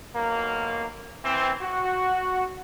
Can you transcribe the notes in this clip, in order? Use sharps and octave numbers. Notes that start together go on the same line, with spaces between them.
B1 A#3
E3 C4
F#4